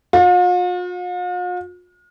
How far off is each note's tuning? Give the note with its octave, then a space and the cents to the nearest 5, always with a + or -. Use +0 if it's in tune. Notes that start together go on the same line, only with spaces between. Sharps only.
F4 +45